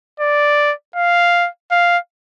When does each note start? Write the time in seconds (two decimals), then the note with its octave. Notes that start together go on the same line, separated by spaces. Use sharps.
0.20 D5
0.96 F5
1.71 F5